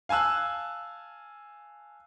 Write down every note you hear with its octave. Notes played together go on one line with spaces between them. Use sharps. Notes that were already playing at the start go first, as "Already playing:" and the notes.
F5 G#5 A5 E6 F#6